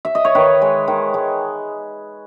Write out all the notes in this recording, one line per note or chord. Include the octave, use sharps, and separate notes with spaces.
E5
D#5
C#5
D#3 B4
G#3
D#3
G#3